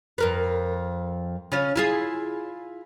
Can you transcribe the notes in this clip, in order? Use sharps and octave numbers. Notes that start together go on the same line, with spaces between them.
F2 A#4 B4
C#3 C#4 F4
E4 F4 G#4